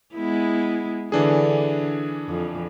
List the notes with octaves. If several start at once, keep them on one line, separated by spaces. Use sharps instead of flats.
G#3 B3 E4
D3 E3 D4 G#4
F2